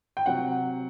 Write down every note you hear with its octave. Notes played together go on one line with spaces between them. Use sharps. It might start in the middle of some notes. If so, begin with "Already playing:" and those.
G5
C3 F#3 F#5